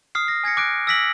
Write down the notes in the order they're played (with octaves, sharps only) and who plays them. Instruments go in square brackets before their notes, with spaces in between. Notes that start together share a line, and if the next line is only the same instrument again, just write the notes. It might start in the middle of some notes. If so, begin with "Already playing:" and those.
[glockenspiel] D#6 F6 C7
A#6
G#5 G#6 A#6 C#7
D6 F#6 D7
E6 F6 A#6 B6 D7 F#7